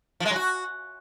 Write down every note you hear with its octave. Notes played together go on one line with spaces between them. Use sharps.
F3
G#3
F#3
F#4